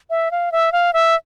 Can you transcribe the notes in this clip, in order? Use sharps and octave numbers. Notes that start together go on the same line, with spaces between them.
E5
F5
E5
F5
E5